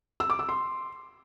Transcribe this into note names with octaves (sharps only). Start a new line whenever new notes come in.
E6
D6
E6
C6